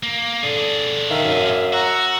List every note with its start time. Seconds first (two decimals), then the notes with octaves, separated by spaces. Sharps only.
0.03 A#3
0.43 D3 D4 G#4
1.10 D#3 E5 F5
1.24 F#2
1.73 F#4 F#5 A#5 E6